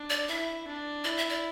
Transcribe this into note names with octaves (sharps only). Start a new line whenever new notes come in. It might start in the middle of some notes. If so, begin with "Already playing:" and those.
Already playing: D4
D5
E4 E5
D4
E4 D5
E5
D5